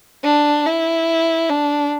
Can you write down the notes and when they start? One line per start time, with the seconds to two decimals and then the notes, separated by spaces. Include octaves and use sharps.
0.24 D4
0.66 E4
1.50 D4